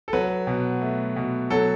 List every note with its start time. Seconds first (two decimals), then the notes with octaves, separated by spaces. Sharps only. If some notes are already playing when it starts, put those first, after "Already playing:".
0.08 A4
0.13 F#3 B4
0.47 B2
0.82 A3
1.16 B2
1.50 F#3 A4